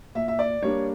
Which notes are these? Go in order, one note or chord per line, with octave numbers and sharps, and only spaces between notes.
A#2 E5
E5
D5
G3 A#3 D4 C#5